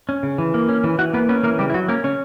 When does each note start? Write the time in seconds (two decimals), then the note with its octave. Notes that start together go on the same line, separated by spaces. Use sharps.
0.09 C#4
0.23 C#3
0.38 E3
0.54 A#3
0.69 C#4
0.84 E3
0.99 E3 F#4 F#5
1.13 A#3 B3 B4
1.29 B3 C#4 B4
1.43 E3 A#3 A#4
1.58 C#3 G3 G4
1.70 E4
1.74 F#3 F#4
1.88 A#3 C#4 A#4
2.04 C#3 C#4 C#5